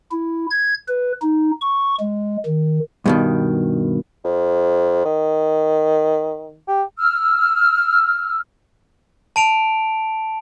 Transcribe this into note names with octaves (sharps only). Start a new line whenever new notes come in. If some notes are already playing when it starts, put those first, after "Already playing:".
E4
G#6
B4
D#4
C#6
G#3
D#3
G2 B2 D#3
F2
D#3
G4
E6 F6
A5 D7 F7